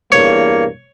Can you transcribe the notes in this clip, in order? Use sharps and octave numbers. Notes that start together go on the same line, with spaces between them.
E2 G2 A#3 C#5